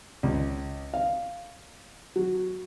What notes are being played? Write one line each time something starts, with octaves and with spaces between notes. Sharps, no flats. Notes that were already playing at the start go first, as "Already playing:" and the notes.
C#2
F5
F#3